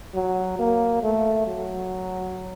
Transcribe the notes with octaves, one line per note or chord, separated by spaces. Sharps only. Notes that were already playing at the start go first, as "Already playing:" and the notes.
F#3
A#3
A3
F#3